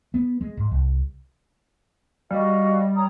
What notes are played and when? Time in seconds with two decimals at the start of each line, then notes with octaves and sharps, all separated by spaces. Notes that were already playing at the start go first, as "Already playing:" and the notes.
0.14 B3
0.41 G#3
0.57 G#2
0.71 C2
2.31 G3 F#4 D#5 F5
2.96 C#5 A#5 D#6